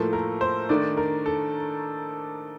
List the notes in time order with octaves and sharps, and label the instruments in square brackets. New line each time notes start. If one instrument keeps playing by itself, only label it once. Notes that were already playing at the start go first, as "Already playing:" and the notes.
Already playing: [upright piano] A2 F3 A#3 A4
A#4
C5
D#3 A3 D4 D5
A#4
A4